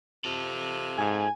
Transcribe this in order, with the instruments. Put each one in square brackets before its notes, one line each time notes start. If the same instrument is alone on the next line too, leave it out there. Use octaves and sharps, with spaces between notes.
[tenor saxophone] C3 [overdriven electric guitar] F4 A4
[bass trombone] G#2 [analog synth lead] G#5